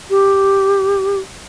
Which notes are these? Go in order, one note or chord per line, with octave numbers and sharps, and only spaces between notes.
G4